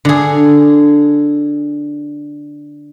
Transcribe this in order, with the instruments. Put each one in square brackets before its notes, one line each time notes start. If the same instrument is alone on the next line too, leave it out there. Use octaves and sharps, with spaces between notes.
[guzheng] D3 G#4